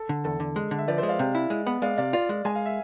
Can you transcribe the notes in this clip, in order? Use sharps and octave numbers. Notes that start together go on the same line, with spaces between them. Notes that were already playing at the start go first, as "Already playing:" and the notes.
Already playing: A4
D3
E2 A4
D3
G#3
D3
E5
F3 B4 D5
C5 E5
G#3
D5 F5
C3
E4
G#3
B3
G#3 D5 F5
C3 D5 F5
F4 D5 F5
G#3
G#3 G#5
F5
E5